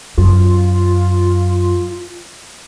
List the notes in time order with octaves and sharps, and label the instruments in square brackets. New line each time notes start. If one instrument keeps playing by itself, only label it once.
[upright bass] F#2 [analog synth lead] F4